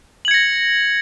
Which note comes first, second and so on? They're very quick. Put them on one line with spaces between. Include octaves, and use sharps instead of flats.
F#7 G#6 C#7 A#6